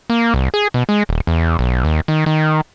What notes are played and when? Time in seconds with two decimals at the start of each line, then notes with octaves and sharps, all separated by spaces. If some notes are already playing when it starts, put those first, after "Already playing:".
0.10 A#3
0.34 C2
0.54 G#4
0.74 B2
0.89 G#3
1.09 D#1
1.27 E2
1.59 B1
1.84 D#2
2.08 D#3
2.26 D#3